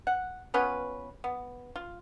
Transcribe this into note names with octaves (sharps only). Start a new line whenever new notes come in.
F#5
B3 C#4 F4 B4
B3
F4